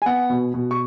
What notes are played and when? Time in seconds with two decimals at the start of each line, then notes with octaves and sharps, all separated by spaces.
0.02 G#5
0.06 B3 F#5
0.30 B2
0.54 B2
0.71 C#6